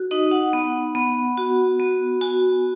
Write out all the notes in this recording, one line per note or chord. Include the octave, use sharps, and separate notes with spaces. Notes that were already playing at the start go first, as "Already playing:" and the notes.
Already playing: F#4
D#4 D#5
F#5
B3
B3
F#4
B3
F#4 G#5